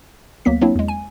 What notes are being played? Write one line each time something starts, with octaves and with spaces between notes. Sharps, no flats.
D2 F#3 A#3 B3 B6
F#3 A#3 C4 D4 E4
E2 G#3
G#5